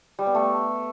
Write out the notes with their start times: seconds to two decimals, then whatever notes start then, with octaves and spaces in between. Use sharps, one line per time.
0.19 G3
0.27 B3
0.35 A3